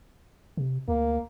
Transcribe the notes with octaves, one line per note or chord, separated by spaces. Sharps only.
C3
D2 A#3